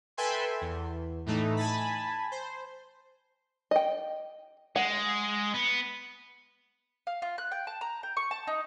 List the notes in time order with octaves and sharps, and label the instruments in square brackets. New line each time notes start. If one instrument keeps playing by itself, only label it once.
[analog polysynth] A4 B4 E5 G5 G#5 C6
E2
A2 E3 A3 D#4
G#5 A5 B5
C5
[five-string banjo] D#5 G5
[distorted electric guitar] G#3 [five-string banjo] F#5
[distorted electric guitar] B3
[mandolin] F5
F4
F#6
G5
A5
A#5
G5
C#6
A5
D#4